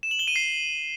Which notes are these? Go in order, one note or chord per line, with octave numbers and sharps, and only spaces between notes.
E7
F#7
G7
D#7
C7